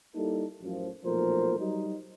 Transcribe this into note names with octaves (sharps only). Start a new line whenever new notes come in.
G3 A#3 D#4 E4 A4
A1 F#2 F3
B1 A#2 F3 A3 A#4 C5
F#3 G3 D#4